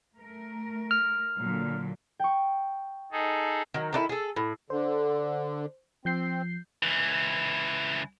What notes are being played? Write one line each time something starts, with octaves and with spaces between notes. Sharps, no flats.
A3 A#4
F6
A#2 D3 F#3
G5 C#6
D#4 G#4 A4
D#3 F#3
D#3 D4 E4 A4
G#4 A4
A2
D3 C5
F3 C4 G6 C7
C#2 E3